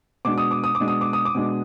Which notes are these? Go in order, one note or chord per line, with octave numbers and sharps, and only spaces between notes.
B2 G#3 D4 D6
D#6
D6
D#6
D6
B2 G#3 D4
D#6
D6
D#6
D6
B2 G#3 D4